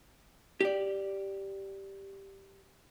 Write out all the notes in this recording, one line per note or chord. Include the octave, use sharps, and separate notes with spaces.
G4 D5